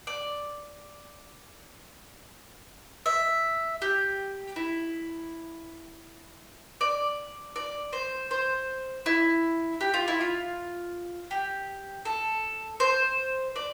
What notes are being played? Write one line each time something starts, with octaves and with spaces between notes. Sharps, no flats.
D5
E5
G4
E4
D5
D5
C5
C5
E4
G4
F4
E4
F4
G4
A4
C5
D5